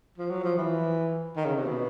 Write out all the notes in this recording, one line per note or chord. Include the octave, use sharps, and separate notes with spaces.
F3
F#3
F3
E3
D#3
C#3
C3
B2